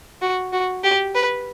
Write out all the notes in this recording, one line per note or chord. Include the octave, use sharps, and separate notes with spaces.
F#4
F#4
G4
B4